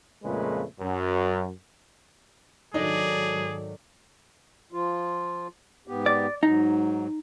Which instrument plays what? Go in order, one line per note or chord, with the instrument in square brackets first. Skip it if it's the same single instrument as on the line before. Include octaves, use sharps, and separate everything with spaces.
[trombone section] F2 A#2 C#3 G#3 A3 B4
F#2
[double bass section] G#2 D#3 F#3 [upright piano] D4 D#4 [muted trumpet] G#4 [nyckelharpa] A4 D5
[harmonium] F3 F4
G#2 B3 G4
[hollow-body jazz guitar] D5
[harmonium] G#2 F#3 [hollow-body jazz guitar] D#4